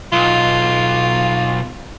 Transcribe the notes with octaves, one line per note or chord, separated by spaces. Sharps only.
B1 F4